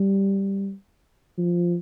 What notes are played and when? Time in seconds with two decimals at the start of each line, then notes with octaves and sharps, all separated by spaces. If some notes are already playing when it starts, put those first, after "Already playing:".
Already playing: G3
1.38 F3